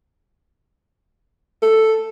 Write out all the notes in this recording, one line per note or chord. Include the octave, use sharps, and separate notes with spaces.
A4